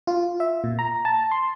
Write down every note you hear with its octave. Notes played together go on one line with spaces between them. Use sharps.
F4
E5
A#2
A#5
A5
C6